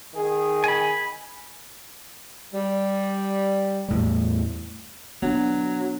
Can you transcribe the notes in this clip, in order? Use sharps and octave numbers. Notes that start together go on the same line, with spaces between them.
D#3 G#4
G#5 B5
G3
E2 A2 G3
F#3 B3 D4